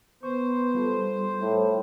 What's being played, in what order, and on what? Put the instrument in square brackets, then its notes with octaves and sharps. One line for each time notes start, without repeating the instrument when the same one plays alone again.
[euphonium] B3 [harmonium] C5 [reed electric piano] C#6
[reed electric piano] G3 F4 A4
[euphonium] A2